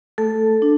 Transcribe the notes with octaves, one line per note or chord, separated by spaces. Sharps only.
A3 A4
D4